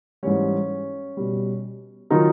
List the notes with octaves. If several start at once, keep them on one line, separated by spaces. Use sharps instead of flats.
G#2 E3 G3 C#4
B2 G3
D#3 F#3 D#4 F4